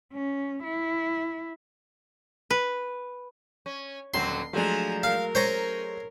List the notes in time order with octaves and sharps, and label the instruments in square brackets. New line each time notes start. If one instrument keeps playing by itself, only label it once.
[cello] C#4
E4
[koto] B4
[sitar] C#4
[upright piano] D#1 [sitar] D3 F#3 C4 [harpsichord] C6
[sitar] F3 D4 [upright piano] F#3 G#3 A3 [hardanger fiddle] G#5 A#5
[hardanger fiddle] A#4 [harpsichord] F5
[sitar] C#4 [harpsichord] C5 C#5 A#5